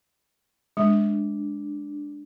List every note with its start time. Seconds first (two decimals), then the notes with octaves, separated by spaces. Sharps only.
0.77 G#3 D4